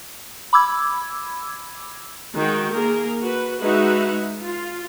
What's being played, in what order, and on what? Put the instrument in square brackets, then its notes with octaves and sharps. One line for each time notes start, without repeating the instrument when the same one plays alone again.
[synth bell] B5 D6 E6 G#6
[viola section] D#3 G#3 F#4 G5
A#3 G#4 A#4
F#4 B4
G#3 D#4 F#4 B4 E5 F#5
F4